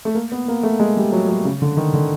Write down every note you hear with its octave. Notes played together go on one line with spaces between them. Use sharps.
A3
A#3
B3
A#3
A3
G#3
G3
F#3
F#3
C#3
D3
D#3
D3